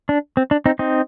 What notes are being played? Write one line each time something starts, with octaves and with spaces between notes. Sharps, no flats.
D4
C4
D4
C4 D#4
C4 D#4